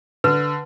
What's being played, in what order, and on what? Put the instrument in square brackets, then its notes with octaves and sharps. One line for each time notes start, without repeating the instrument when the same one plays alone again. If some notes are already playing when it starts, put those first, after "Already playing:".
[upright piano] D3 [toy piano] B4